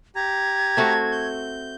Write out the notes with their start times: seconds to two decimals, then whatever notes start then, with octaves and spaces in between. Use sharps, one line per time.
0.16 G4 A#5 G#6
0.77 A3 C4 F#4
1.12 G6